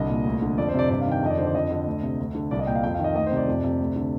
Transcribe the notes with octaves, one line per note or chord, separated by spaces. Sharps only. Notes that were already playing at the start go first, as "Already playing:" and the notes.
Already playing: C2 D3 D#5
A#2
D2
D3
F2 D5
C5
C3 D5
G2 D5
F5
D#3
G5
F2 D#5
D5
D3 C5
D5
F2 D#5
D3
D2
C3
D2
D3
C2 D5
D#5
A#2 G5
F5
F2 G5
F5
D#3
D#5
D2 D#5
C5
C3
D5
F2
C3
D2
D3